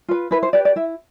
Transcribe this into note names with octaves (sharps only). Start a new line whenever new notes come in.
F4 B4
E4 B4
C5
G4 B4 D5
D5
E4 E5